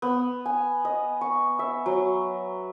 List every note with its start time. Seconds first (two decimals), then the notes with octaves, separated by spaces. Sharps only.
0.02 B3
0.46 G#5
0.85 D#5
1.21 C#6
1.59 E5
1.86 F#3